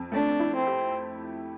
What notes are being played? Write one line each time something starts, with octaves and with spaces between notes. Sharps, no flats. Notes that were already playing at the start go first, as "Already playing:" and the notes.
Already playing: F2
A3 D4
E4
C4
G4